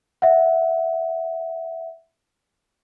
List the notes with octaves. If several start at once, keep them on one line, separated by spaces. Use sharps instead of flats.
E5 F#5